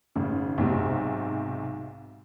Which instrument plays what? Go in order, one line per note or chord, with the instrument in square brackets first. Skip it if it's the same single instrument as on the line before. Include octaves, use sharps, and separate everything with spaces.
[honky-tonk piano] G#1 C#3
B1 G#2 C3